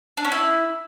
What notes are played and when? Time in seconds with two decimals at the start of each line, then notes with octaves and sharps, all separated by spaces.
0.17 D4
0.25 C#4
0.32 E4